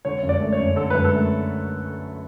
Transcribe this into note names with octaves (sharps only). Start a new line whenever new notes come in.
D3 C#5
F#2
D5
A3
C#5
F#2
D3 A4
F#2 B4
A4
A3